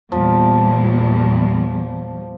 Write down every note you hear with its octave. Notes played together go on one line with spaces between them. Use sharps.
E2 A#2 F3 G3